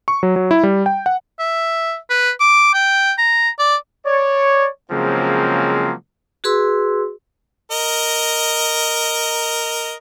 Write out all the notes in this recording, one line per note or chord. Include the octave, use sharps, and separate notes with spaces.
C#6
F#3
F#3
E4
G3
G5
F#5
E5
B4
D6
G5
A#5
D5
C#5 D5
C#3 F3 F#3 G#3 A#3 C4
F#4 G#4 B4 C6 E6
A#4 D#5